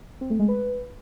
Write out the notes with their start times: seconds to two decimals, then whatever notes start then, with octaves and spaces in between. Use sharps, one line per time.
0.21 C4
0.30 A3
0.39 G#3
0.48 B4